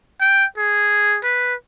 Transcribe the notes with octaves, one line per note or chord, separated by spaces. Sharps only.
G5
G#4
B4